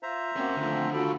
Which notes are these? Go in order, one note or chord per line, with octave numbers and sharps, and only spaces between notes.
F4 C5 E5 A#5
A#3 C4 C#4 F#4
D#2 D3 F3 A3 C4
F4 F#4 A4 G5 B5